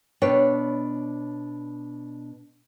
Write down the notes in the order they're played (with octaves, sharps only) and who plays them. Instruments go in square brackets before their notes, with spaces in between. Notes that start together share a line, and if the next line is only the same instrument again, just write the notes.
[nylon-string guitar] B2 D4 B4 C#5 G5